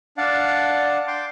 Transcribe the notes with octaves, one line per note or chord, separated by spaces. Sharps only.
D4 D5 F5 F#5 A5
G5 C6 D6